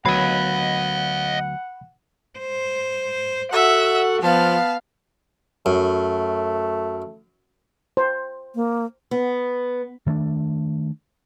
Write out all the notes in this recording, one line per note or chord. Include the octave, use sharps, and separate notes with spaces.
D2 F#3 B3 D#5 F5 F#5 B5
C5
F#4 A4 E5 F#5
F3 B3 F5 A5
F#2 A3
C5
A#3
B3
D#3 A3 C4 D4